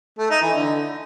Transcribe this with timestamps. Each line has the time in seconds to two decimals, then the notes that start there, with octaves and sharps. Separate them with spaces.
0.18 A3
0.30 D#4
0.42 E3
0.54 D3